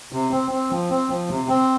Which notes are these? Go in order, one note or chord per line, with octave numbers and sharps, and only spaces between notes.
C3
C4
C4
F3
C4
F3
C3
C4